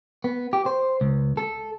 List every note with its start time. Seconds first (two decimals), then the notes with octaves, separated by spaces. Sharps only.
0.24 B3
0.53 G4
0.66 C5
1.01 C#2
1.37 A4